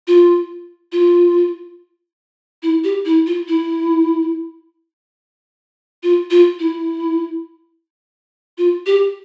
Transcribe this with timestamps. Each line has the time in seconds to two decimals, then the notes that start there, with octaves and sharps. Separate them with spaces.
0.07 F4
0.92 F4
2.63 E4
2.84 G4
3.05 E4
3.27 F4
3.48 E4
6.03 F4
6.31 F4
6.60 E4
8.58 F4
8.86 G4